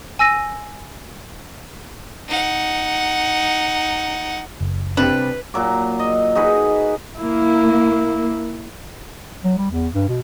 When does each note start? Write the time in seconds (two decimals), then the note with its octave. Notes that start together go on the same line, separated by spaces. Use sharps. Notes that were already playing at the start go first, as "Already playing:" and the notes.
0.19 G#5 E6 A#6 D#7
2.28 D#4 F#5
4.61 F#1
4.97 C3 C4 D4 G4 B4 D5
5.54 A#2 F#3 D6
5.99 D#5
6.35 D#4 F#4 G#4 B4
7.18 A#3 E4
9.44 F#3
9.57 G3
9.71 E2
9.95 G2
10.08 B2